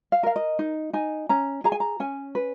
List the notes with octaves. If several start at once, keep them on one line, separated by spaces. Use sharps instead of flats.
F5
A#4 F5
D#5
D#4
D#4 G#5
C#4 A#5
G#4 A#5
G#5
A#5
C#4 G#5
B4